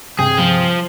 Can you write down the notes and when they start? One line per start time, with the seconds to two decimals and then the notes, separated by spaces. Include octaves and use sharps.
0.19 G2 C3 G#4 G5
0.38 F3